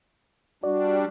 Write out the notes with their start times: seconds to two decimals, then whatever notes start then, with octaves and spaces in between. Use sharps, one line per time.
0.64 G3 D4 F#4 D5